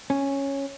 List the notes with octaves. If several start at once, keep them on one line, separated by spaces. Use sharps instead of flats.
C#4